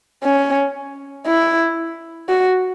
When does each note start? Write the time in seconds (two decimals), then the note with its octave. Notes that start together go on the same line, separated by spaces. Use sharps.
0.24 C#4
1.27 E4
2.29 F#4